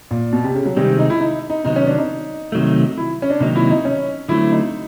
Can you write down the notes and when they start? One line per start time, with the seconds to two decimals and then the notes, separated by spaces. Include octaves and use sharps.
0.11 A#2
0.33 B2
0.44 C3
0.55 C#3
0.66 F#3
0.76 C3 D#3 G3 G#3 C4
0.99 D#4
1.10 E4
1.20 D#4
1.50 D#4
1.65 C3 D#3 F#3 B3 D#4
1.76 C#4
1.87 D4
1.98 D#4
2.52 C3 D#3 F#3 A3
2.97 E4
3.22 C#4
3.30 D4
3.40 C3 D#3 F#3 A#3 D#4
3.56 E4
3.70 D#4
3.85 C#4
4.29 D3 F#3 A3 C4 E4
4.51 D#4